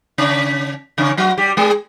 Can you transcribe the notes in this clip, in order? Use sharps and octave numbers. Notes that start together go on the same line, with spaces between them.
C#3 C#4
C#3 C#4
F#3 F#4
G3 G4
G#3 G#4